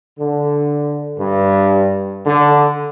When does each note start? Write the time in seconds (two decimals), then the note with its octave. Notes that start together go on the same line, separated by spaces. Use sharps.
0.19 D3
1.18 G2
2.26 D3